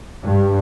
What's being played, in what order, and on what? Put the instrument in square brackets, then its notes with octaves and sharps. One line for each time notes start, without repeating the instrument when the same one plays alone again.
[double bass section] G2